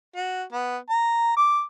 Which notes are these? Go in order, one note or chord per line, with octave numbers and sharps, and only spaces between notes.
F#4
B3
A#5
D6